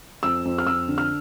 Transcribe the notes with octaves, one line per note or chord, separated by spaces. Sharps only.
F2 E6
F2
F6
F2 E6
D3
F6